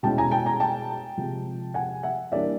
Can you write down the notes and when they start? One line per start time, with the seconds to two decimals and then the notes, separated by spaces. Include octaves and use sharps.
0.03 B2 G#3 C#4 E4 G5 A5
0.18 G#5 A#5
0.31 G5 A5
0.46 G#5 A#5
0.60 G5 A5
1.17 C3 F3 G#3
1.74 F#5 G#5
2.03 E5 F#5
2.32 E3 G3 A#3 D4 D5 E5